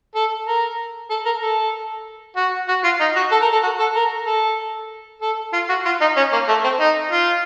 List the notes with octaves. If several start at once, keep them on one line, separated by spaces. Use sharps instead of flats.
A4
A#4
A4
A#4
A4
F#4
F#4
F4
D#4
F#4
A4
A#4
A4
F#4
A4
A#4
A4
A4
F4
F#4
F4
D#4
C#4
A#3
A3
C4
D#4
F4